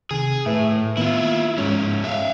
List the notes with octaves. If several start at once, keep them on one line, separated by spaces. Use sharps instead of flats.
C3 D#3 G#4
A2 B4 E5
D#3 A#3 B3 E4 F4
G#2 G#3 C#4 C#5
E5 F5